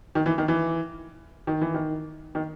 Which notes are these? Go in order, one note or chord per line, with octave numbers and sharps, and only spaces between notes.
D#3
E3
D#3
E3
D#3
E3
D#3
D#3